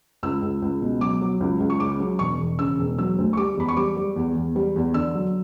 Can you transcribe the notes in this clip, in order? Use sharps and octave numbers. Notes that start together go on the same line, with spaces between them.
C#2 E6
C#2
C#2
B2
F#3 D6
F#3
C#2
C#2
C#6
C#3 D6
F#3
E1 C#6
E1
C#3 E6
E1
F#3 E6
D2
C#6
G3 D6
E2 B5
C#6
G3 D6
G3
E2
E2
G3
E2
D3 E6
F#3